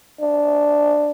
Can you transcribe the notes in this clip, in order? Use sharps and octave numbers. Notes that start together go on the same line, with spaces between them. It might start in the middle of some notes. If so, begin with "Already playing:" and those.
D4